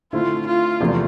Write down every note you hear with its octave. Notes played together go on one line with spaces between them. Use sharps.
D3 A3 C4 E4 F4
F4
E2 C3 F3 A3 D4